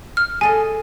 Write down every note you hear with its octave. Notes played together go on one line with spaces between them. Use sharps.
F6
G#4 A4 D#5 G#5